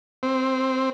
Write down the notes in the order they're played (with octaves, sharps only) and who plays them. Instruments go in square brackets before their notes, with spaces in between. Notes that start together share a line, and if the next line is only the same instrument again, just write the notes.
[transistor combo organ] C4